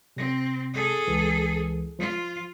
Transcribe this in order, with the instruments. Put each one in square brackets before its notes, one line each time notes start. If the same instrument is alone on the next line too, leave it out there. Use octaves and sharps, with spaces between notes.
[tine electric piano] C3 A#6 [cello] C4
[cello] G#4 A4
[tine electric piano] C#2 E3
[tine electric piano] F3 [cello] F4